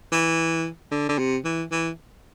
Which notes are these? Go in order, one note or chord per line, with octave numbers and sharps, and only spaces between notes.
E3
D3
D3
C3
E3
E3